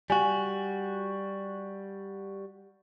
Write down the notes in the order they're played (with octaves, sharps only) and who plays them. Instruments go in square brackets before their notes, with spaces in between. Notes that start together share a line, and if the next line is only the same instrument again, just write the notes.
[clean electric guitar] G3 F#4 [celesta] G#5